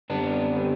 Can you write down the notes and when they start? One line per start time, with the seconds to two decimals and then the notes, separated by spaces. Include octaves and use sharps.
0.10 F#2 D3 G3 B3 C4 D4
0.56 D3 G3 C4